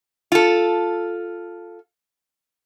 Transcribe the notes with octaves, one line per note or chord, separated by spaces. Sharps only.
F4 A4